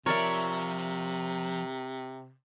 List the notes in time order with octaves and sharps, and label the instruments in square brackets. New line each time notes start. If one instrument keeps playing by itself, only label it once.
[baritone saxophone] C3 [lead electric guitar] F3 [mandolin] A#4 [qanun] C#5 D5 E5